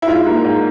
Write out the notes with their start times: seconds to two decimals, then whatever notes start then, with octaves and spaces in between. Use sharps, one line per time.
0.02 E4
0.08 G#2 F4
0.27 A#3
0.44 G#2